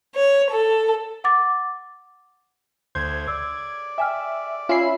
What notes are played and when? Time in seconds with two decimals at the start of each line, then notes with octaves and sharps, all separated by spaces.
0.15 C#5
0.50 A4
1.24 F#5 D6 A6
2.95 D2 C5 G6 G#6
3.28 D5 E6
3.98 E5 G5 G#5 F6
4.69 C#4 F4 E5 B5 C7